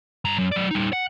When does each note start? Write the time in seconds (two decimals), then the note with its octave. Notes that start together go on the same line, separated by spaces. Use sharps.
0.25 G2 A#5
0.39 F#2
0.52 F#3 D5
0.71 G3 D#4
0.93 F#5